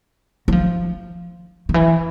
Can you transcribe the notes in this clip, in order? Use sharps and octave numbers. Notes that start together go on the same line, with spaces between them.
F#3
F3
D#3
E3